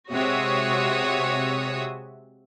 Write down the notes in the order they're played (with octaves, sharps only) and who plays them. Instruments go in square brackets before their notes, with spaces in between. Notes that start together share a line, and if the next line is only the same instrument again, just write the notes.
[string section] C3 G#3 F#4 C#5 E5 D#6